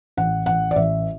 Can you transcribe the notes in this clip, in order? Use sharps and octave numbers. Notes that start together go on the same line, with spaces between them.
A1 F#5
A1 F#5
D5
A1 E5